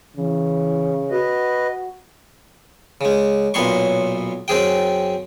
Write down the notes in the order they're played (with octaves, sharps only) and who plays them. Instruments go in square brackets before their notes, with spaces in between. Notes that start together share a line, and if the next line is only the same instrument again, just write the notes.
[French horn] C#3 [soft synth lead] E3
[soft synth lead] F#4 [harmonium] B4 D#5
[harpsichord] C#3 G#3
B1 A#2 B3 C#5 C6 C#6
F#2 C4 G#4 G5